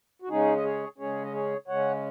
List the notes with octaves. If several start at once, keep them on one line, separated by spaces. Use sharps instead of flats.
F#4
C#3 G#3 C#4 D#4 G#4
D#5
G#4 C#5
C#3 G#3 C#4 G#4 C#5
D#5
G#4 C#5
C#3 G#3 C#4 C#5 F#5